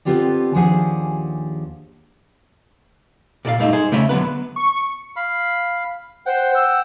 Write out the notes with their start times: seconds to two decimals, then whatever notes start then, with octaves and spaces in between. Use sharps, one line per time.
0.05 D3 B3 C4 F4 G4 D5
0.54 D#2 F3 D4 G#4 F#5 G#5
3.45 A#2 A4 D5 F5
3.59 G2 A#2 A3 D#4
3.73 D#4 G#4 C5
3.92 C#3 A3 C#4 E5
4.09 D3 F#3 B3 B4
4.56 C#6
5.16 F5 B5
6.26 C5 F#5 G5
6.54 E6